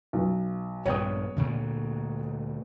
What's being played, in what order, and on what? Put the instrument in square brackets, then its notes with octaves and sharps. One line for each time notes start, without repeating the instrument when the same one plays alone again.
[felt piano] B1
[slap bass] A#1 G2 B3 [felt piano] C#5 G5 D#6
[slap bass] D2 A#2 D3